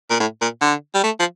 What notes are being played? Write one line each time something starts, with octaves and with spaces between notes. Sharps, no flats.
A#2
A2
A#2
D3
G3
A3
F3